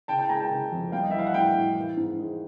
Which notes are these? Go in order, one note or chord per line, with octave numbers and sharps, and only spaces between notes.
C#3 G5 A5
G5 A5
G#3 G#5 A#5
G5 A5
C#3
F2
G3 F5 G5
D#5
E3 E5
F5
F#5
A2 F5 G5
A2
E3
G#2
G#3